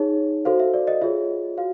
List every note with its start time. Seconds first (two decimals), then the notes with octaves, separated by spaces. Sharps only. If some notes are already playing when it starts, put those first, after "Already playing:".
Already playing: D#4 G#4 C#5
0.45 F#4 A4 C5 F5
0.59 E5
0.74 D5
0.87 D#5
1.02 F4 G#4 C#5 E5
1.58 F#4 F5